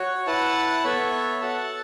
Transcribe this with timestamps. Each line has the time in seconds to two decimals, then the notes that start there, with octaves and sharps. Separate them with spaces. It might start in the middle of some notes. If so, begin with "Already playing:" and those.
Already playing: F#4 C#5
0.26 E4 B4 F#5 A5
0.84 B3 A4 C#5 E5
1.41 F#4 A4 F#5 A5